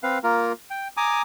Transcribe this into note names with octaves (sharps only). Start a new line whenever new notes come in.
C4 B4 F5
A#3 F4 A#4
G5
G#5 A#5 D6 D#6